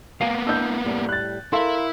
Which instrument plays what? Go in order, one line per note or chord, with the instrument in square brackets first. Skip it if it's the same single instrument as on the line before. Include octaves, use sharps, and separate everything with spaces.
[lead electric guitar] A#3 B3 [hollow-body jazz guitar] F5 G#5 A#5
[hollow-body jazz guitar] D4 E4 D#5 [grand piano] E6 G6
[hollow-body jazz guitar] A2 G3
[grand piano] F#6 A6
[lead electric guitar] E4 [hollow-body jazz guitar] A4 [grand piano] A#4 F5 C6